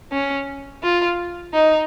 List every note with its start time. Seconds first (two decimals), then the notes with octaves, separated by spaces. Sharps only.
0.12 C#4
0.83 F4
1.53 D#4